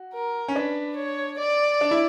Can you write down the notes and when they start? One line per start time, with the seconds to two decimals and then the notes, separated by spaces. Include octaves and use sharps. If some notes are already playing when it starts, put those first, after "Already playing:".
Already playing: F#4
0.14 A#4
0.48 C#4
0.55 D4 B4
0.96 C#5
1.38 D5
1.81 D4
1.91 E4